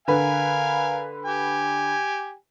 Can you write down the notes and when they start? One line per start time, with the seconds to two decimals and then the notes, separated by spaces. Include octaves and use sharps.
0.08 D3 A#4 B4 F5 G#5
1.25 G4 G#5